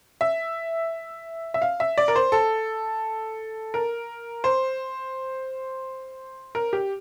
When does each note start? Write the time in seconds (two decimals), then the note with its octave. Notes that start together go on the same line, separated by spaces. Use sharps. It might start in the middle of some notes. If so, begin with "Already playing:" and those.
0.21 E5
1.54 E5
1.62 F5
1.80 E5
1.98 D5
2.08 A#4
2.16 C5
2.32 A4
3.74 A#4
4.44 C5
6.55 A#4
6.73 G4